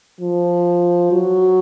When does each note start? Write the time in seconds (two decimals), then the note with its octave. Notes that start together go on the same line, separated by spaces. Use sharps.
0.21 F3
1.12 F#3